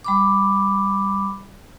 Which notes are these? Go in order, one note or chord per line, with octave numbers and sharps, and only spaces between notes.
G3 B5 D6